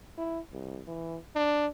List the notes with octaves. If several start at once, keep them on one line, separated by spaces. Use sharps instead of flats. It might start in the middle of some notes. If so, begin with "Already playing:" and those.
E4
C2
E3
D4